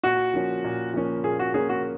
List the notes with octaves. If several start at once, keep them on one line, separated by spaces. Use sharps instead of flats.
A#2 F#4
F3 A#3 C#4
A#2
F3 A#3 C#4
A#2 G#4
F#4
F3 A#3 C#4 G#4
F#4